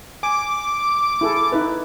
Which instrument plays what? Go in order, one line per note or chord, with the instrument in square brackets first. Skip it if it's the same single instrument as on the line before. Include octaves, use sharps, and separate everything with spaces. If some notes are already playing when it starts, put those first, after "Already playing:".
[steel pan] G#5 [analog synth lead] D6
[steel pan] E4 G#4 A4
D#4 E4 B4